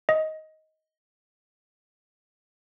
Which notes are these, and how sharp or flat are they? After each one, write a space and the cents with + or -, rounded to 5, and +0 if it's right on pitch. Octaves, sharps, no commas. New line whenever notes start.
D#5 +15